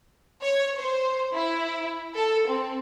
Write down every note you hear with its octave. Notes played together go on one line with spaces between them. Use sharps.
C#5
C5
E4
A4
C4